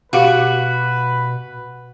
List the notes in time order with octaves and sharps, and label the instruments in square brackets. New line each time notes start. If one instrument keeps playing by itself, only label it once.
[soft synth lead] B2 [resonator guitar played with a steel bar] F#4 [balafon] G4 F5 F#5 [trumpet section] B4